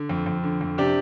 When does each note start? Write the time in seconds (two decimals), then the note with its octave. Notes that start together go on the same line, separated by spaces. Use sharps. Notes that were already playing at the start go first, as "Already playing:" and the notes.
Already playing: D3
0.09 F2
0.26 F2
0.43 D3
0.61 F2
0.78 C3 D4 G4